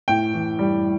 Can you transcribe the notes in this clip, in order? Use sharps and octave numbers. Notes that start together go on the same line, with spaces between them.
A2 G5
E3
G3